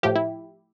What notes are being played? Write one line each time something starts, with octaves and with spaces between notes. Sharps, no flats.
A2 F3 G4
E4